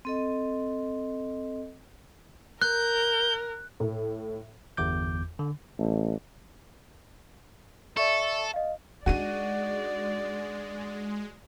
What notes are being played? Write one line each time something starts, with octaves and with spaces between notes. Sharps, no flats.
C4 A4 D#5
A#4 F#6 G6
A2
G1 E2 D6 G6
D3
A1
A4 D5 E5 C#6
D#5 F5
G#3 D4 D#4 F#4 D5 D#7